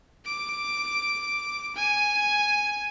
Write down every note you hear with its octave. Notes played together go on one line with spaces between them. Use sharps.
D6
G#5